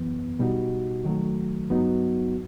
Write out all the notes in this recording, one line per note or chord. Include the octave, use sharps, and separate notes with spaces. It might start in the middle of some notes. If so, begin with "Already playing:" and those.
Already playing: F#2 E3 B3
B2 G3 D#4 F#4
D#3 F#3 A3
G2 F#3 B3 D#4 F#4